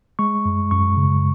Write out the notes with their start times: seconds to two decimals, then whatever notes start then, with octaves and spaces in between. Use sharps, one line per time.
0.19 G#3 C#6
0.45 F#2
0.71 F#2 C#6
0.97 C#3